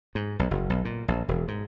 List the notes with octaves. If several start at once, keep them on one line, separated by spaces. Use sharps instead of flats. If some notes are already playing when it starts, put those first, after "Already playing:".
G#2
B1
F#1
B1
A#2
A#1
E1
G#2